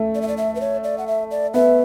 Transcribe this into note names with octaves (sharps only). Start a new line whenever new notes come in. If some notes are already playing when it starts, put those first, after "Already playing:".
Already playing: A3
D5
E5
D5
E5
B4
C#5
D5
F#5
E5
D5
B3 E5